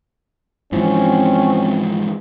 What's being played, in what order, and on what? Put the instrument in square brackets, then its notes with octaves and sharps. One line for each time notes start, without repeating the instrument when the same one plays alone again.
[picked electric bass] G#2 E3 F3 [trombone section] C4 C#4